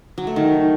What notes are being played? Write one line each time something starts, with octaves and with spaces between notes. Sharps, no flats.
F#3
A3
D#3